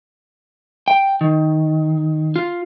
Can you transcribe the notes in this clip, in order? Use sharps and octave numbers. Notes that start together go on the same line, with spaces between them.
G5
D#3
F4